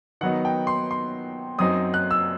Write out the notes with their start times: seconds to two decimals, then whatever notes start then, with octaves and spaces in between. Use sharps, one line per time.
0.21 D#3 F#3 B3 D#4 F#5
0.45 G5
0.67 C6
0.91 C6
1.58 F#2 F#3 C4 D#4 D#6
1.94 F#6
2.11 E6